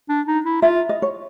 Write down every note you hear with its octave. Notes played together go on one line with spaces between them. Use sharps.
D4
D#4
E4
F4 E5
D#5
C#5